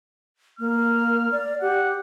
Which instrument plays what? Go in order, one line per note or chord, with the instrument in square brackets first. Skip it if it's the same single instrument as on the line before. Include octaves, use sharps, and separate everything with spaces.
[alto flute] A#3 [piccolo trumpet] F6
[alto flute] D5
[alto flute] G4 [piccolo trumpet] F#5